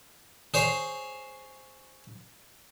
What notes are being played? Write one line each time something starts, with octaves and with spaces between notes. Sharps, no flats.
G#4 C5 C#5